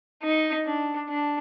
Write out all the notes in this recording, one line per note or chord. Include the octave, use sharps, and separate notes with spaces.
D#4
D4
D4